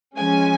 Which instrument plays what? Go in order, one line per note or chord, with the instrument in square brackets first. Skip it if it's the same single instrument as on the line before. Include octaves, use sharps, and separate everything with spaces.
[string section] F3 G#3 C#4 G#5